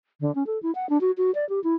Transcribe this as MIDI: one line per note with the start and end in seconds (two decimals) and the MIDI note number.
0.21 0.33 50
0.35 0.46 61
0.46 0.61 69
0.62 0.73 64
0.75 0.89 78
0.89 1.00 62
1.01 1.11 66
1.17 1.33 66
1.35 1.47 74
1.49 1.62 67
1.64 1.75 64